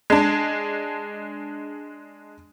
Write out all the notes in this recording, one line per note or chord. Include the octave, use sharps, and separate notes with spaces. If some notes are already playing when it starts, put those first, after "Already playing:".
G#3 D4